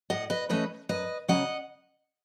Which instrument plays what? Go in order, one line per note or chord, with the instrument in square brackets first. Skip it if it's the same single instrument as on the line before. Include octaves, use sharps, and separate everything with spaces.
[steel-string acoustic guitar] A2 D#5 F#5
B4 D#5
E3 A3 C#4 B4 D#5
F#2 B4 D#5
C#3 F#3 C#4 D#5 F#5